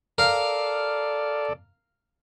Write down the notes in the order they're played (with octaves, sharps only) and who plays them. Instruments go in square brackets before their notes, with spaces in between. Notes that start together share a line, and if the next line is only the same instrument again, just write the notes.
[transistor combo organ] A4 D5 [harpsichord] A#4 F5